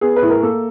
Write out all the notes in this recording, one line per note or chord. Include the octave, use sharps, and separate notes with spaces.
B3 G#4
B4
A2
A#4
A#3 A4